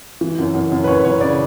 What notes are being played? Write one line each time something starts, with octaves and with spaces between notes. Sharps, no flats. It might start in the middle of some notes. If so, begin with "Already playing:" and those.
E3
F#2
F#2
F#2
B4
F#2 C#5
B4
F#2 C#5
C#3 D5